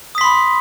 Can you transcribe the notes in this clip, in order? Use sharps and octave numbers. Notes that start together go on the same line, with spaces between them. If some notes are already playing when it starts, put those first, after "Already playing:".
B5 C6 D#6 B6